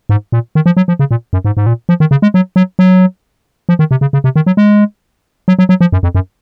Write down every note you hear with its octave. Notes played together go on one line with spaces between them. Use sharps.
G#2
A#2
D#3
F3
F#3
F3
C#3
A#2
F#2
G#2
G#2
A#2
F3
D#3
C#3
G#3
F#3
F#3
F#3
F3
D#3
C3
C#3
C#3
C3
D#3
F#3
G#3
F#3
F#3
F#3
F3
F#2
F2
F#2